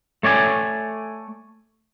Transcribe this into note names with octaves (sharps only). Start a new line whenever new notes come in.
A3 C#5 D5 G#5